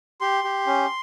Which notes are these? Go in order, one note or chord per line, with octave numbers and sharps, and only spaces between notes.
G4 C6
G4
C#4